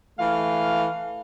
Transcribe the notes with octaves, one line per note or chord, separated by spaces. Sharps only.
E3 A3 F5